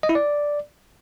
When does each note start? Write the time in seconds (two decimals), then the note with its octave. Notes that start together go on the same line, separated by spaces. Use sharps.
0.03 D#5
0.09 E4
0.15 D5